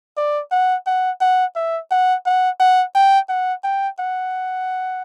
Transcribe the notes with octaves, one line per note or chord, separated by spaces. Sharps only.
D5
F#5
F#5
F#5
E5
F#5
F#5
F#5
G5
F#5
G5
F#5